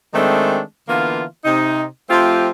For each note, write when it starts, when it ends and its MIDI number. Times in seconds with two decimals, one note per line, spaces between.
0.13 0.60 51
0.13 0.60 56
0.13 0.60 57
0.13 0.60 60
0.13 0.60 62
0.88 1.23 50
0.88 1.23 52
0.88 1.23 58
0.88 1.23 59
0.88 1.23 65
1.45 1.84 48
1.45 1.84 63
2.10 2.49 53
2.10 2.49 57
2.10 2.49 60
2.10 2.49 65
2.10 2.49 67